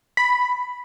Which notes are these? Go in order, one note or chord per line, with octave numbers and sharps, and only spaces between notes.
B5